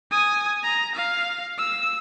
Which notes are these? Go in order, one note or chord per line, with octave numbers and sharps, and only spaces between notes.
G#5 D#6
A#5
F5
E6